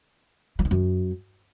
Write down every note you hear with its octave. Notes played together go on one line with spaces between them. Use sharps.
F3
D#3
F#2